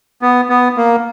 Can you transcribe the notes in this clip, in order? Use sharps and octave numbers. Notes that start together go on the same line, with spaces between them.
B3
B3
A#3